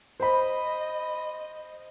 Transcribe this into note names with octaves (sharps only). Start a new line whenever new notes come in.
C5 D#5 B5